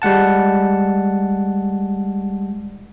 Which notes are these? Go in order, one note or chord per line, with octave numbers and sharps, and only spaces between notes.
G3 G#3 F#5 A5